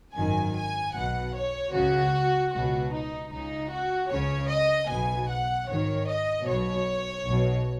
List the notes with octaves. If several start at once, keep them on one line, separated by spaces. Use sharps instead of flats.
G#1 F#2 D#3 G#5
G#5
B1 B2 F#5
C#5
C#2 C#3 F#4
C#2 B2 F#4
D#4
C#2 C#3 D#4
F#4
C#2 C#3 C#5
D#5
B1 B2 G#5
F#5
G#1 G#2 D#3 C#5
D#5
B1 B2 C#5
B1 B2